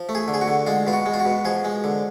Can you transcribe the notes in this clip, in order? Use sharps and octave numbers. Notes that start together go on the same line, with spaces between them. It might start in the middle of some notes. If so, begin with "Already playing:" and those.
Already playing: F3
A3
G#4
D3
G#4
F#4
D3
G#3 F4
B2 F4
F#4
G#3
F4
F#4
B2
F3 G#4
G#3
D3